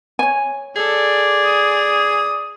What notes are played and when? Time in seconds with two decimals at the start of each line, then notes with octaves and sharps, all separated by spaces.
0.19 C#5 G#5
0.76 G#4 A4 D5
1.45 D#6